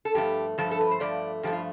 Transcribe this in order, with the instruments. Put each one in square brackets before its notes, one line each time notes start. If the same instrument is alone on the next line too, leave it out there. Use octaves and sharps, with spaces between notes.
[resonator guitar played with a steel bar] A4
G2 F3 A3 G4
G2 F3 A3 A4
A4
B4
C5
G2 F3 A3 D5
G2 F3 A3 G4
F4